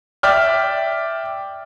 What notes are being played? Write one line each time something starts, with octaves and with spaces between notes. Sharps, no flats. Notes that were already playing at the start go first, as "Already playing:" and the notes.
D5 E5 G5 F6